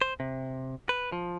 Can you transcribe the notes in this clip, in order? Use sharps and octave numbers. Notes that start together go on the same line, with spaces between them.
C5
C3
B4
F3